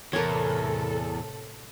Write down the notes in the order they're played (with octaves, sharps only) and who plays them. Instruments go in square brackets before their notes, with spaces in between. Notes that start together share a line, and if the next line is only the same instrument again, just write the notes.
[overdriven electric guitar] E2 [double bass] A2 C3 [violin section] A4 [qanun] A#4 C#5